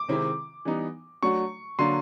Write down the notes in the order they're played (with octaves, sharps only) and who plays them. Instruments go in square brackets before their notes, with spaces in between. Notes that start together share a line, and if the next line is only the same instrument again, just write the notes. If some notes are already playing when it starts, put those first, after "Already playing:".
Already playing: [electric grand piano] D6
[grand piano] C3 D#3 G#3 C4 E4
E3 G3 B3 D#4
[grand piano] F#3 A3 D4 F#4 [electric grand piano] C#6
[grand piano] D3 F#3 A#3 D4 [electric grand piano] C6